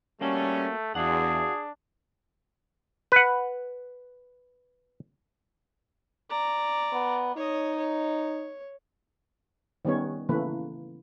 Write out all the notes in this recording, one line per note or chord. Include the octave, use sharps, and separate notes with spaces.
G3 A3 A#3 C#4 F#4 A4
E2 D4 F#4 G#4 F5 F#5
B4 F#5
D5 A#5
B3
D#4 C#5 D#5
C#5
D#3 G3 B3 C#4 C#5
C#3 E3 A3 A#3 B4